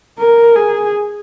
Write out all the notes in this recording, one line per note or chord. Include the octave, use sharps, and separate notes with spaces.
A#4
G#4